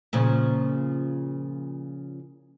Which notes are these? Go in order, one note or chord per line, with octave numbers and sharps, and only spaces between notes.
A#2 C#3 F3